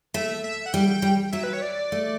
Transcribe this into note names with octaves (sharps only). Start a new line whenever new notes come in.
A3 E5
E5
F#5
G3 G5
G3
F#3 E5
B4
C#5
D5
A3